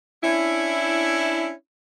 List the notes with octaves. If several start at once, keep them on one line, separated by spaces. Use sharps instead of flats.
C#4 D4 E4